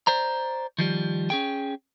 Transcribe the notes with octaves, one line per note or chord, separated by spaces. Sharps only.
C5 D5 A#5
D#3 F3 G3
C#4 G#4 G5